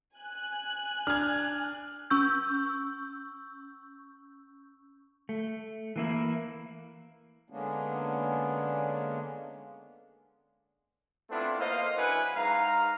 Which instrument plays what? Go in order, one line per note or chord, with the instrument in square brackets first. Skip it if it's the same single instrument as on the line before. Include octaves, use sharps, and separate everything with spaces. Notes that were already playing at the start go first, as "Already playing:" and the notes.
[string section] G#5 F#6
[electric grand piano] D4 [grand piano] F6 G#6
[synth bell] C#4 C#6 E6 G6
[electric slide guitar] A3
E3 A#3 E4
[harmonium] D3 G#3 A#3 B3 C#4 D4
[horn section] A3 B3 C4 D4 E4 F4
A#3 B3 C5 D#5 F5
F#2 D4 E4 B4 F#5 G#5
G#2 F5 A#5